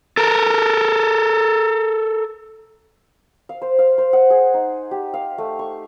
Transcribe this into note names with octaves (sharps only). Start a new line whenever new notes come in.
A4 A#4
F5
C5
F5
C5
F#5
G#4
D#4
G4
F5
A3
C#6